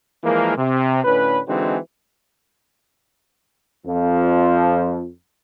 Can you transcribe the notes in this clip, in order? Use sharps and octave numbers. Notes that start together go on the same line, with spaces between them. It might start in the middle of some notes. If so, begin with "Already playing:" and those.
E3 F3 G#3 A#3
C3
A2 D3 C#4 B4
D3 E3 G#3 C4 D#4 F#4
F2 F3